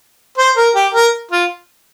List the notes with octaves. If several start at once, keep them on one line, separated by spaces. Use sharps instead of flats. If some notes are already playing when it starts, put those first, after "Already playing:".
C5
A#4
G4
A#4
F4